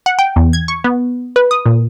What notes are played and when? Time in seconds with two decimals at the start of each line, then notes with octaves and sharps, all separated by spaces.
0.06 F#5
0.19 G5
0.36 E2
0.53 G#6
0.68 C#6
0.84 B3
1.36 B4
1.51 D#6
1.66 A#2